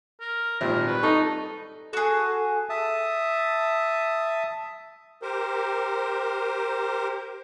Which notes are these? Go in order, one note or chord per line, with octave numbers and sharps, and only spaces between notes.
A#4
G#1 A#2 G3 A#4
B4 C#6
D#4 A4 C#6
F#4 G#4 A4
E5 A5 D#6
G4 A#4 C5